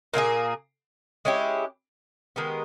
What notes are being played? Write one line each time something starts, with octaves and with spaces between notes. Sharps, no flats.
A#2 A#3 E4 G#4
G#3 C#4 E4 G4
D#3 G#3 B3 G4